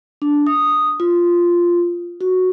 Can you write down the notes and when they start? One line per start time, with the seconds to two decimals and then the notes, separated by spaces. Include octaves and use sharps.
0.22 D4
0.47 D#6
1.00 F4
2.21 F#4